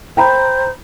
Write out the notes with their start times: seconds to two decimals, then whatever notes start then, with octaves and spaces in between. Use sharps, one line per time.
0.17 C5 G5 A#5 B5